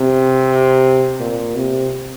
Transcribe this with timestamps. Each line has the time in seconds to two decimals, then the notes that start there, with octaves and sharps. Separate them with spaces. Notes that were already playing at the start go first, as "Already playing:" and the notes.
Already playing: C3
1.20 A#2
1.56 C3